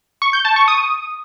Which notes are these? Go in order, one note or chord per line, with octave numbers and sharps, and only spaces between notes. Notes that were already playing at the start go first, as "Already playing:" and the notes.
C#6
G6
A5
C#6
D#6